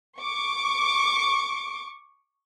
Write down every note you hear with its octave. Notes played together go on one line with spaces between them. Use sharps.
C#6 D6